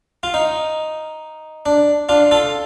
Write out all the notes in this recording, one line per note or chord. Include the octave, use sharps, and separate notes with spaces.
F4
D#4
D4
D4 F4
F4 A4